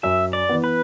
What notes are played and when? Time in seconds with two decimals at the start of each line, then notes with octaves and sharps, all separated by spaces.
0.03 F#2 E5
0.33 D5
0.49 E3 B3
0.64 B4